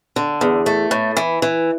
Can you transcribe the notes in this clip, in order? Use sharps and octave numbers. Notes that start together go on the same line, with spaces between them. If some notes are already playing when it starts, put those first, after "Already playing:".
D3
E2
A3
A2
E3
E3